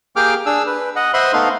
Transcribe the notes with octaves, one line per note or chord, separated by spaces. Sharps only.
A#3 G4 G#4 G5 D6 F6
D4 G#4 E6
B4
D#5 F#5
C5 D#5 E5 F#5 B5 C6
A3 B3 D#4 F5 C6